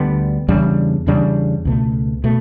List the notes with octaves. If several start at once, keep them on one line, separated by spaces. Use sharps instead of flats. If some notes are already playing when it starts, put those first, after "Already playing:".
Already playing: D2 D3 G3 B3
E2 C#3 G3 D4
E2 C#3 G3 D4
C#2 B2 A3
B2 A3